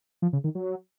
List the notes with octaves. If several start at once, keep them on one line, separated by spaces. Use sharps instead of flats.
F3
C#3
D#3
F#3